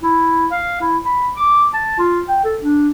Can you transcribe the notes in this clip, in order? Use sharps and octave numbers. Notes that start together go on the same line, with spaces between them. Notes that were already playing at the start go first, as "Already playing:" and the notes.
E4
F5
E4
B5
D6
A5
F4
G5
A4
D4